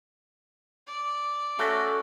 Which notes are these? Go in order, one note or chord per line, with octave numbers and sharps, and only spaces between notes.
D5
A3 C#4 F#4 A4